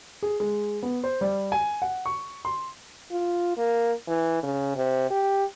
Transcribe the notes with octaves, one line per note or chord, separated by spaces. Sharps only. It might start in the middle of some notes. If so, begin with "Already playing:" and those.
G#4
G#3
B3
C5
G3
G#5
F#5
C#6
C6
F4
A#3
E3
C#3
C3
G4